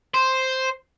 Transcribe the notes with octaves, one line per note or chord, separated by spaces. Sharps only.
C5